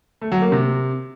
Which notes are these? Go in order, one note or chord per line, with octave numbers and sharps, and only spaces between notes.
A3
F#3
A#3
C3